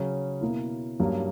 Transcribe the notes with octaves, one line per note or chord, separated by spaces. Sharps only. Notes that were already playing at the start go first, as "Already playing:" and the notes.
Already playing: C#3 F#3 C#4
B2 A#3 E4
G2 F#3 A#3 C#4